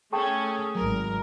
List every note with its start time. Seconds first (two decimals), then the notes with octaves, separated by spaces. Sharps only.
0.13 A3 C#4 G#4 G5 A5 C#6
0.75 G#1 F#3 A#4